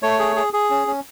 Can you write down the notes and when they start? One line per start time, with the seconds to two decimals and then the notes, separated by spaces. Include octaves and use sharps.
0.03 A3 C#5
0.19 G#4
0.36 G#4
0.53 G#4
0.70 C#4
0.87 C#4